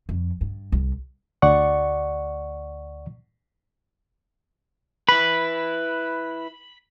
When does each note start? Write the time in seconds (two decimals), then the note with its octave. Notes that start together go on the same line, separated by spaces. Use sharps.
0.09 F2
0.41 G2
0.72 C2
1.42 D2 D5 F#5 C#6
5.09 E4 B4 B5